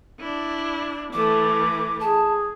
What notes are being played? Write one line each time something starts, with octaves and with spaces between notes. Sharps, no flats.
D4 E4
E3 A3 A4 D6
G#4 A5